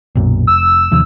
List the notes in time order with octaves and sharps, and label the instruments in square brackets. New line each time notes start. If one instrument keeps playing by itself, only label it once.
[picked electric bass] B1 F#2 A#2
[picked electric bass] F1 [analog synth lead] E6
[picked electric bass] D#2 C3 F3